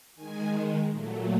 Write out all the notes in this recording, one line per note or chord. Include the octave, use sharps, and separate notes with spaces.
D#3 G#3 G#5
A#2 F#3 A3